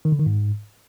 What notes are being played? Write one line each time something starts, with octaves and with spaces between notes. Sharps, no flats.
D#3
D3
D#3
G#2